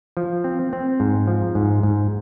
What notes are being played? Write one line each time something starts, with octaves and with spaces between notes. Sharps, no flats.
F3
C4
C4
G#2
F3
G#2
G#2